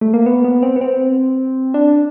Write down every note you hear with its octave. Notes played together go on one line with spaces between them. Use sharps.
A3
A#3
B3
B3
C4
B3
C4
D4